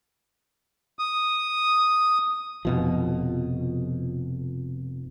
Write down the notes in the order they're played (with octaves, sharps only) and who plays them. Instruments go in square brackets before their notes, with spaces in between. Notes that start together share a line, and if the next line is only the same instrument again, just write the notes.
[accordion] D#6
[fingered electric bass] F1 B2 F3